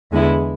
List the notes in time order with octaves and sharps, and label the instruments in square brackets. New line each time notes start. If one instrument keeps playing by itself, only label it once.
[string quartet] E2 D3 G#3 B3 E4